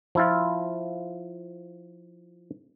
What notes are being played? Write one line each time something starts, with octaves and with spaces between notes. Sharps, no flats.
F3 E4 F4